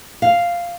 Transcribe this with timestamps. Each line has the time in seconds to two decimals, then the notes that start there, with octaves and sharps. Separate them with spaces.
0.22 F5